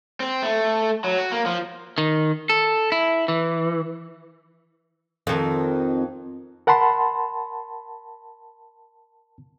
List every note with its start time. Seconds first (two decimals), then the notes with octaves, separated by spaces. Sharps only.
0.20 C4
0.43 A3
1.04 F#3
1.18 F#4
1.32 A#3
1.46 F3
1.98 D#3
2.50 A4
2.92 E4
3.28 E3
5.27 F2 D#3
6.67 A#4 F#5 A5 B5 C6